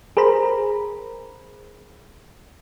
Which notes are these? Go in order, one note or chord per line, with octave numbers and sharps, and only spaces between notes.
G#4 A#4 C5 A#5 B5